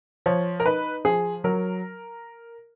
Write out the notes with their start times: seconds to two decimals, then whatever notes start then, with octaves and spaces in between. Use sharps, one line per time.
0.26 F3 C#5
0.60 A#4
0.65 D#4 B4
1.05 F3 G#4
1.44 F#3 A#4